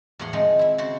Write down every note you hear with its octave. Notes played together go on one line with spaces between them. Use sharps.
E2 A2 F3 C#5 F#5 C6
D#3 F3 G#3 C4
E4 E5
C#3 F#4 C5